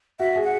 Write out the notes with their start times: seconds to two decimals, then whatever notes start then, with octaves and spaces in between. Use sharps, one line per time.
0.19 F#4 E5
0.36 G#4
0.44 F#5